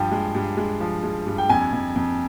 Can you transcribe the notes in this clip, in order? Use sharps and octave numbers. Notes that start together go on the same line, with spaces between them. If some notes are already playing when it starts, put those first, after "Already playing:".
Already playing: G2 F3 G5
G#3
G2
G#3
F3
G#3
G2
G5
F2 G#5
F2
F2